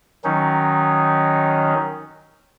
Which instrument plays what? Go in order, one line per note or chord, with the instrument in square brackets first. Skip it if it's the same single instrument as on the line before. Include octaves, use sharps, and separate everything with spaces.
[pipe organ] D#3 F#3 C#4 D#4